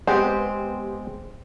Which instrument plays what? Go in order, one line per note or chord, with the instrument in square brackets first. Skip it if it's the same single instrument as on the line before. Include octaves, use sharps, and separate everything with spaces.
[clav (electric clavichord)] G#3 [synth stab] B3 G4 [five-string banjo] C4